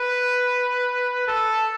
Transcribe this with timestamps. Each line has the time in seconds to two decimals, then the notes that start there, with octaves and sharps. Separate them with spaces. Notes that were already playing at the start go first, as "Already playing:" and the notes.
Already playing: B4
1.28 A4